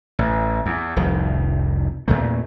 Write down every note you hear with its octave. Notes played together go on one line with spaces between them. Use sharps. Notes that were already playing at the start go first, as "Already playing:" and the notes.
A1
E2
F1 C2 F2 D#3
E2 A#2 A3